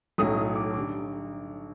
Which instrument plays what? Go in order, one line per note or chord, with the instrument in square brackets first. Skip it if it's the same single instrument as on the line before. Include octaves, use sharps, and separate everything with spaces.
[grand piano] B1 A2 F#3 A3 C#4 D#6
D#6
D6
D3 G3 D6